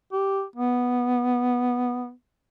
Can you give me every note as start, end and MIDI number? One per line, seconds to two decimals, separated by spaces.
0.12 0.43 67
0.56 2.11 59